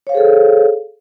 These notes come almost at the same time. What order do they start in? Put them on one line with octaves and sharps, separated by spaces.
C#5 F5 C5 G#4 A4